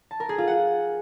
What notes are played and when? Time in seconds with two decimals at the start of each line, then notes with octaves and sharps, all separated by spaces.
0.11 A5
0.20 A#4
0.29 G#4
0.38 F4
0.47 F#5